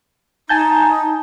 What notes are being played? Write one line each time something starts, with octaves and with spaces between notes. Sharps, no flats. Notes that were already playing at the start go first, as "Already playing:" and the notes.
D#4 G#5 A5 G6